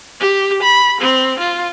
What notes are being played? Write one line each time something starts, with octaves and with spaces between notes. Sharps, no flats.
G4
B5
C4
F4